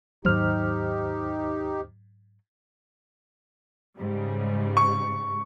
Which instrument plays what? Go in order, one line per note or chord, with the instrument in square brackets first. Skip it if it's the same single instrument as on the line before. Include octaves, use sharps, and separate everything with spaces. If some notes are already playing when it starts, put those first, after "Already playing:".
[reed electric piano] D#2 C5 F6 [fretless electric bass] G#2 F#3 [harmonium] D#4 G4
[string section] G#2 C#3 G3
[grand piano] C#6